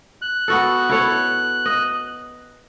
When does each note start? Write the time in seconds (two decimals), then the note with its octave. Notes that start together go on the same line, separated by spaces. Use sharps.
0.22 F#6
0.48 B3 F#4 A4
0.89 E4 A4 C#5
1.66 D#5